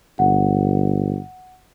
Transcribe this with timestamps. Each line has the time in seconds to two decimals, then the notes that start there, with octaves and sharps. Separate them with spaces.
0.19 G1 F#5